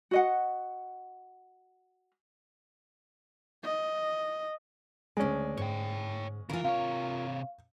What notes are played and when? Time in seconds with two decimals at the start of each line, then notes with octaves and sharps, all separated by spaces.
0.11 F#4 D#5 F#5
3.63 D#5
5.17 D2 G#3 C#4 D5
5.58 G#2 C#5 G5
6.49 C#3 E3 F4 A#4
6.65 C3 C#5 F5